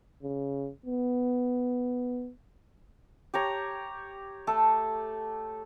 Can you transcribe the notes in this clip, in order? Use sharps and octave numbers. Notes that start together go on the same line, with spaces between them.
C#3
B3
G4 C#5 A#5
A3 A4